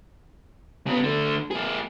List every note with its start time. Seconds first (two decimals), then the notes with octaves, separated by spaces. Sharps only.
0.87 C#3 B3
1.03 D3 A3
1.51 A#3 G#4